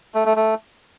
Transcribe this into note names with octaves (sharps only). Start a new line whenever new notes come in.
A3
A3
A3